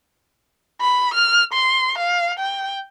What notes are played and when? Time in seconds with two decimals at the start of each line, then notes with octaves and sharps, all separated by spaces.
0.81 B5
1.14 F6
1.53 C6
1.98 F5
2.39 G5